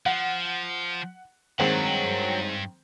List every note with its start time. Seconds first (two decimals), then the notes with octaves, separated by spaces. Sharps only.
0.06 F3 F#5
1.59 G2 D#3 G#3 C4 C#5 F#5